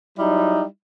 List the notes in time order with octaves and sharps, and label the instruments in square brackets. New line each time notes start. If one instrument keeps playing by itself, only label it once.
[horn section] F#3 G3 D#4 E4